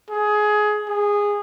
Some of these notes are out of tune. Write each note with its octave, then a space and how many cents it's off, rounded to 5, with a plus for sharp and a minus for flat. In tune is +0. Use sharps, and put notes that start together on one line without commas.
G#4 +20
G#4 -15